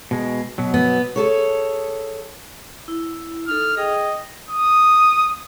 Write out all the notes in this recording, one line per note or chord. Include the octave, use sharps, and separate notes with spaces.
B2 G#3
B2 F#3
B3
G#4 A4 C#5
E4
D#4 A4 F6
G#4 D#5 G5
D#6